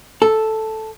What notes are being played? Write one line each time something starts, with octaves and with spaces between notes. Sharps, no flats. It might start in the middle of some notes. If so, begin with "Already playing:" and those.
A4